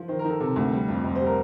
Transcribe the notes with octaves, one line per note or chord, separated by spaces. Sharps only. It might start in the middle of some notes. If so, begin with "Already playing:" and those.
Already playing: F3
D#3 C5
A#4
D#3
A4
C3 A4
D2
G3 G4
F2 F4
F2
C5
G3
A#4